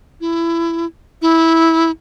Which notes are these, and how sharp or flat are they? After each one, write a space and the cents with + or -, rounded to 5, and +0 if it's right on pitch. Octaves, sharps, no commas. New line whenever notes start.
E4 +20
E4 -15